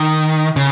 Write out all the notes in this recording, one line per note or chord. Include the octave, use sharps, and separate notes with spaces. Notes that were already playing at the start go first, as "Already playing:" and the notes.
Already playing: D#3
C#3